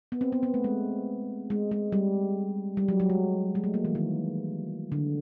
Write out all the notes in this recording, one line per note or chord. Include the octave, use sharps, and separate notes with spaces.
B3
C4
B3
B3
A3
G#3
G#3
G#3
G3
G3
F#3
F#3
G#3
G#3
A3
A#3
E3
D#3
D3